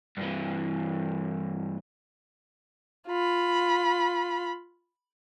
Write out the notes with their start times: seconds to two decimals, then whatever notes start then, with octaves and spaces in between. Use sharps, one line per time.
0.17 G2 E3
3.07 F4 B5